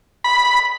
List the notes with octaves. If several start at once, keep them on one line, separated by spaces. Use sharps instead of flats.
B5